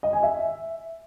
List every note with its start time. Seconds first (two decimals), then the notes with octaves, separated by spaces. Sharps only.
0.03 D#5
0.13 G#5
0.23 E5